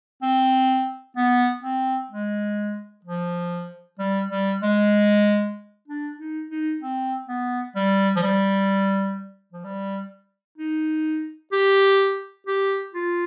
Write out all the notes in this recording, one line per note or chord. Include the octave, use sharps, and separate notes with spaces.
C4
B3
C4
G#3
F3
G3
G3
G#3
D4
D#4
D#4
C4
B3
G3
F3
G3
F3
G3
D#4
G4
G4
F4